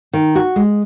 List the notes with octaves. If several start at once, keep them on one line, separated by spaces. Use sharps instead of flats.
D#3
F#4
G#3